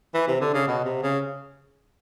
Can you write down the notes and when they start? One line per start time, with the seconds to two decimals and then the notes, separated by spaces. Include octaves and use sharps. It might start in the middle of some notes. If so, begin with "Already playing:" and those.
0.14 E3
0.28 C3
0.41 D3
0.54 C#3
0.68 B2
0.85 C3
1.03 C#3